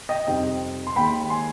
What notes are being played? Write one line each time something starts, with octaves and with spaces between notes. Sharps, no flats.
D#5 G5
F2 C3 G3 C4 D#4 D#5 G5
C6
D#2 D#3 G#3 G5 B5
G#5 C6